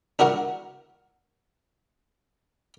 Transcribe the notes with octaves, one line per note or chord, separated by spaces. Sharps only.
D4 E4 F#4 A#4 F#5